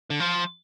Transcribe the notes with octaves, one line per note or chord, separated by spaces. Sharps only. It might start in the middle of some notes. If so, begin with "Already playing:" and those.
D3
F3